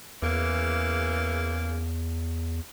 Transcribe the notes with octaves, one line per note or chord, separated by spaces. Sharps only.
E2 C#3 E3 A#3